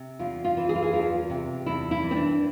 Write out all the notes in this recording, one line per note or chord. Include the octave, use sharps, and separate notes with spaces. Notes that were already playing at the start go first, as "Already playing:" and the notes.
Already playing: C3
E2 F4
F4
E3
G#4
F4
G#4
E2 F4
C3
E2 E4
E4
E3
C4
D4